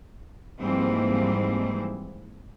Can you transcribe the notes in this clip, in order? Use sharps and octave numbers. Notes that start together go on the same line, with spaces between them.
G#2 E3 F3 G3 A#3 C4